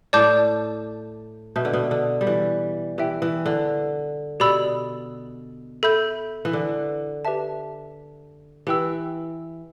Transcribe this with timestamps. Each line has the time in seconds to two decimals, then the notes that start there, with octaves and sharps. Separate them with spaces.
0.13 A2 D5 A5 D6 G6
1.56 B2 B4 E5 A5 G6
1.65 D3
1.73 B2
1.91 D3
2.21 G3
2.27 E3
2.98 E3 G4 E5 G5
3.22 E3
3.46 D3
4.40 B2 G4 D5 B5 E6
5.83 A4 E5 B5 G6
6.45 E3
6.53 D3
7.25 G4 B4 E5 A5
8.67 E3 G4 B4 G5 E6